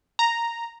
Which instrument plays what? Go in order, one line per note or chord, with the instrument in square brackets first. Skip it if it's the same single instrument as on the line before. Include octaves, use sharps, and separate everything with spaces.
[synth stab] A#5